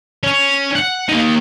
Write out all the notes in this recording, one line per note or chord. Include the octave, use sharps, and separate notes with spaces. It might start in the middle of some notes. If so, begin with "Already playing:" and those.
C#4
F#5
A#3 D#4